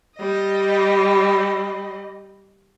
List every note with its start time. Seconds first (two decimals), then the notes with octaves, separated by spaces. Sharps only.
0.17 G3 D#5